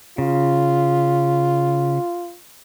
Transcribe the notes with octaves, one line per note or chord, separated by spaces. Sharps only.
C#3 F4